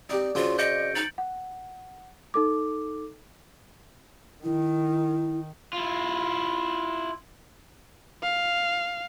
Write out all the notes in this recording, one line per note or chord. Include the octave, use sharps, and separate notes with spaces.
C4 D#4 G4 D5
C#3 C4 F4 F#4
D#5 G6 C#7 D7
D#4 A6 F#7
F#5
D#4 A4 D6
D#3 E4
E4 F4
F5